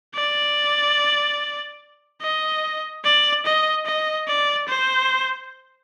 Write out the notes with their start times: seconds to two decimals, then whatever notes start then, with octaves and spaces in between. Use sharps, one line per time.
0.15 D5
2.21 D#5
3.04 D5
3.45 D#5
3.86 D#5
4.27 D5
4.68 C5